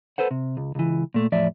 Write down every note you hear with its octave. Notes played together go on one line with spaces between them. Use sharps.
A4 B4 C5 F#5
C3
C#2
C#2 E3
A#2 A3
E2 A2 F3 D5 E5